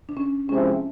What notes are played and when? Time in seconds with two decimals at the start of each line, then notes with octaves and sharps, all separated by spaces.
0.09 D4
0.17 C#4
0.49 C3 F3 G#3 C4 C#4 E4